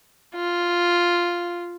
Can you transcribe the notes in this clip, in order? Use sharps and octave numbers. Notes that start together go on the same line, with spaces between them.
F4